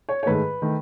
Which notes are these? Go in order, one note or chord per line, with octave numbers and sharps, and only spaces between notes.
C#5
C#5
G#2 D#3 A3 B4
D#3 A3